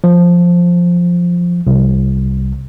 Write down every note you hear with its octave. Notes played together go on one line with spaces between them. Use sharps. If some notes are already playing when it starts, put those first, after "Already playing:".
F3
C2